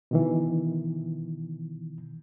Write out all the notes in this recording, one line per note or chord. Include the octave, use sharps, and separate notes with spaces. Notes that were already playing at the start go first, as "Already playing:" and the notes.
B2 D#3 E3